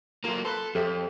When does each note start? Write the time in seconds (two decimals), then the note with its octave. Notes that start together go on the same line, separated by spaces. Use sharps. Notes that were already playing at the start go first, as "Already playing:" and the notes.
0.24 F#3 A#3 F4 A4 A#5
0.45 A4 B4 C6
0.75 F2 G4 A4 E5 E6